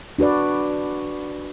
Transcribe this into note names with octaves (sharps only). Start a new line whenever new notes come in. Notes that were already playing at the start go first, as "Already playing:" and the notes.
D4 F#4 B4 D5